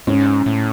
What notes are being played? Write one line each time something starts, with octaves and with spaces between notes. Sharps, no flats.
G#2 C#4
A2